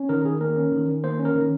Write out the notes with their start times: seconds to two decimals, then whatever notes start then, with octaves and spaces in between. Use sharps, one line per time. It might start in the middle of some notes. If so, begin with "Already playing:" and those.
Already playing: C#4
0.09 D#3 A#4
0.25 D#3 G#4
0.41 A#3 A#4
0.56 C#4
0.72 D#3
0.88 D#3
1.04 A#3 C5
1.19 C#4
1.25 A#4
1.35 D#3